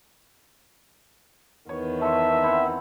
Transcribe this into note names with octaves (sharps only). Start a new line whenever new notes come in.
E2 D#3 B3 C#5
A4 E5 C6
C4 E4 F#5